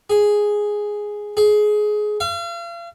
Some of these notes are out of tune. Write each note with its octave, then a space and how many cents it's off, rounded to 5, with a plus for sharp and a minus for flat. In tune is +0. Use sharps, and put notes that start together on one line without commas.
G#4 +0
G#4 +20
F5 -40